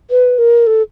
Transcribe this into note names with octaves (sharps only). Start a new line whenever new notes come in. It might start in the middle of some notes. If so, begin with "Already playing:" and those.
B4
A#4
A4